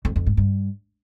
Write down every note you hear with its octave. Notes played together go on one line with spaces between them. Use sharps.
F2
F2
G#2
G2